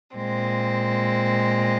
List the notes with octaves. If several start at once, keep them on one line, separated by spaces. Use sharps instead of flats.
A#2 G#3 C4